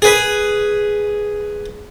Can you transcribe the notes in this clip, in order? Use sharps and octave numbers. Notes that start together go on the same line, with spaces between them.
G#4 B4